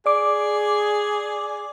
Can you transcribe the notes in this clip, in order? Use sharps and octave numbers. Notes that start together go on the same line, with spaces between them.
G#4 D5 D6